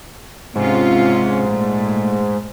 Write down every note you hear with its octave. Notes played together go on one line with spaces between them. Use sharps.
G#2 C3 C#4 F4
A#2 A3